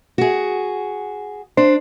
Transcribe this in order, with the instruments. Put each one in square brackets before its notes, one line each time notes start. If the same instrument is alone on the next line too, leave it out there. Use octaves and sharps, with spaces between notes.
[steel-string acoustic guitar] F#4 G#4
[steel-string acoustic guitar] D4 [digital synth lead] C5